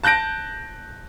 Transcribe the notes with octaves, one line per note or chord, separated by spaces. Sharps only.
A5 F#6 G6 A#6 D7